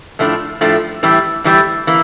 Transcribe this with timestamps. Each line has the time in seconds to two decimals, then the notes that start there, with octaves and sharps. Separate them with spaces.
0.19 A2 F3 A3 D4
0.61 A2 F3 A3 D4
1.03 A2 E3 G3
1.44 A2 E3 G3
1.87 E3 A#3